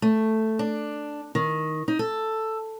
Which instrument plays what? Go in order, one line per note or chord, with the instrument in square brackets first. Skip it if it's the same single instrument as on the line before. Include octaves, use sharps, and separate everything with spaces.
[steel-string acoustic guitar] A3
D4
D#3
D#4
A4